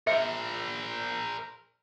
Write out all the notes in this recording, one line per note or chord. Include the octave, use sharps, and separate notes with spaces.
A#4 C5 E5